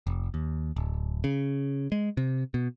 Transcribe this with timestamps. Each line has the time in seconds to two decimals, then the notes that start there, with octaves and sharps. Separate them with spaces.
0.07 F1
0.34 D#2
0.76 D1
1.24 C#3
1.92 G#3
2.17 C3
2.54 B2